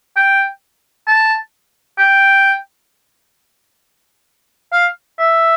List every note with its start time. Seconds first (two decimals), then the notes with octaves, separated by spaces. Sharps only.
0.17 G5
1.07 A5
1.98 G5
4.72 F5
5.19 E5